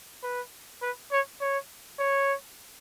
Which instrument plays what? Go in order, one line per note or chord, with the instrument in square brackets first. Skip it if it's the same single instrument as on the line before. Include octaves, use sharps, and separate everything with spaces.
[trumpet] B4
B4
C#5
C#5
C#5